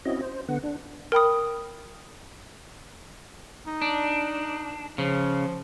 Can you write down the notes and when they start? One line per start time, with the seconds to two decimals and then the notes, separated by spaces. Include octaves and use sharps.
0.05 C4 C#4 E4 F#4 D#5
0.21 C5
0.48 D3 B3 F#5
0.63 D4
1.12 A#4 G5 B5 D#6
3.67 D#4
3.82 D4
4.98 C#3 F3